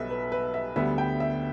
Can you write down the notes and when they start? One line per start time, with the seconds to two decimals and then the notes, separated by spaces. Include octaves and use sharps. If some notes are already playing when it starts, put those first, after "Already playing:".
Already playing: B1 B2 G3 A4 B4 E5
0.10 B4
0.32 B4
0.54 E5
0.76 D2 D3 G3 B3 E5
0.98 G5
1.20 E5